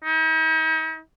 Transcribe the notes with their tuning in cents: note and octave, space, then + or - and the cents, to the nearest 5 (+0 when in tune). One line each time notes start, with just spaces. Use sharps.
D#4 +45